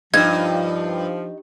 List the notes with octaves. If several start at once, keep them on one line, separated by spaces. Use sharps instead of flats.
G2 F3 D#4 G#6